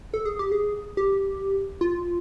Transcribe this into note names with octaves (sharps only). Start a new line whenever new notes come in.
A4
G#4
G4
G#4
G4
F4